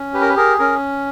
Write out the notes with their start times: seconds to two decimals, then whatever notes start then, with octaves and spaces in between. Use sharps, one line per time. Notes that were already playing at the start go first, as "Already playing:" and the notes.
Already playing: C#4
0.14 G4 B4
0.21 A#4
0.29 B4
0.36 G#4 A#4
0.59 C#4 A#4